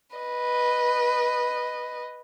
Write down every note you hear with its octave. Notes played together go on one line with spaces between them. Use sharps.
B4 D#5